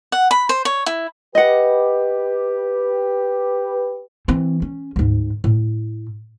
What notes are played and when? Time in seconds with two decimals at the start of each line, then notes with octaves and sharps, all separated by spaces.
0.12 F#5
0.31 B5
0.49 C5
0.65 C#5
0.86 E4
1.35 G4 B4 D#5 F#5
4.28 E3 C4
4.62 C#4
4.96 D2 G#2
5.44 A2